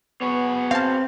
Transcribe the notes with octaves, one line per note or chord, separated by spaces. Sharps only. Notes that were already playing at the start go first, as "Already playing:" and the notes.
B3 F#4 G#4 C#5
C4 F5 A5